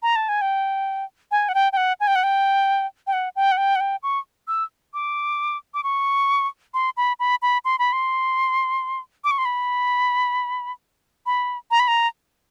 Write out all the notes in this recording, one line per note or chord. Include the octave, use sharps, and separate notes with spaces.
A#5
A5
G#5
G5
G#5
F#5
G5
G5
F#5
G#5
G5
F#5
G5
G5
F#5
G5
F#5
G5
F#5
G5
C#6
E6
D6
D6
C#6
C6
B5
B5
B5
C6
B5
C6
D6
C#6
C6
B5
B5
A#5
B5
A#5